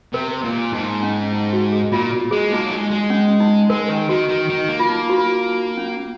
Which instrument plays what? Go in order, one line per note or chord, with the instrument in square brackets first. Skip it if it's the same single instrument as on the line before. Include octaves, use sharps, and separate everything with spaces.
[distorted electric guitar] C3 [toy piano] A#4
[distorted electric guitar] A#2
[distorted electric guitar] G#2 [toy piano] D#4
[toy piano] C#4
D#4
F#4
G#4
[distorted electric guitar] A#2 [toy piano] F4
[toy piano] F#4
[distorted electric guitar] G#3 [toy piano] G#4
[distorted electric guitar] A#3 [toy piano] D#4
[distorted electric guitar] F#3
G#3
G#3
[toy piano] C#4
D#4
[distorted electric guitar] G#3 [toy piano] A#4
[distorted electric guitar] D#3
[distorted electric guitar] D#3 [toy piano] F#4
[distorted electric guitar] D#3
D#3
A#3
[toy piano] F4
D#4
F#4
F4
D#4
C#4